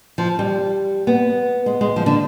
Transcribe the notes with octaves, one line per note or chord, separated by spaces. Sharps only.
F3
G3
B3
G#3
G#3
F3
D3